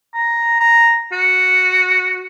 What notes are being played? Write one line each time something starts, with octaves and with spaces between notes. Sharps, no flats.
A#5
A#5
F#4